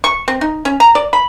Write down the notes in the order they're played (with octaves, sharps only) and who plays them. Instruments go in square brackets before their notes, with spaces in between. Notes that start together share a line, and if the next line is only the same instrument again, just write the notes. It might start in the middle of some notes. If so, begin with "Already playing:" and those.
[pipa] C#6
C4
D#4
C#4
A#5
D5
B5